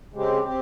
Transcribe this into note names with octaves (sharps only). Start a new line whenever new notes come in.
C#3 G#3 C4 G4
C4 G4